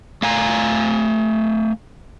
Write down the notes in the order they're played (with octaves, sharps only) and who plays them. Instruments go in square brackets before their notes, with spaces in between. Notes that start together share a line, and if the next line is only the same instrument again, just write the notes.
[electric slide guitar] A3 F5 G#5 A#5